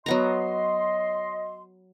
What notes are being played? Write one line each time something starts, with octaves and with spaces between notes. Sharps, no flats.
F#3 B3 D#5 A#5 C6